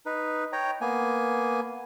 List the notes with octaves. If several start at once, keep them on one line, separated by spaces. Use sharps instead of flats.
D#4 B4
C#5 G5 A#5
A#3 B3 G#5